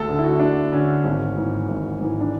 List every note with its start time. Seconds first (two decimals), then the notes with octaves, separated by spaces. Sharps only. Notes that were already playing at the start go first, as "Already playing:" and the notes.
Already playing: D2 A4
0.09 D3
0.19 E4
0.24 F#4
0.40 D2 D4
0.72 D3 C#4
1.04 G#1 C#4
1.37 G#2 E3
1.68 G#1
2.00 G#2 E3
2.21 D4